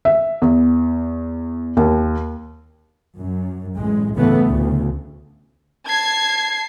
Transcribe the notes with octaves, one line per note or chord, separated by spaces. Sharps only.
E5
E2
D#2
F#2
A1 G#3
G1 A2 C#3 E3 A3 B3
D2 C#3
A5 G#6 C7